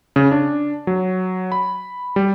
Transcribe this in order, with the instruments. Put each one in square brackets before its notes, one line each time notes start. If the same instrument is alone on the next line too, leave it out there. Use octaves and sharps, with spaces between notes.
[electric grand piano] C#3
D4
F#3
B5
G3